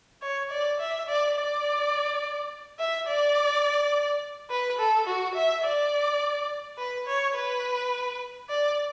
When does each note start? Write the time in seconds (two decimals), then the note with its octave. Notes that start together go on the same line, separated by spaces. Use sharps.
0.22 C#5
0.51 D5
0.80 E5
1.08 D5
1.37 D5
2.79 E5
3.08 D5
4.50 B4
4.79 A4
5.07 F#4
5.35 E5
5.64 D5
6.78 B4
7.07 C#5
7.35 B4
8.49 D5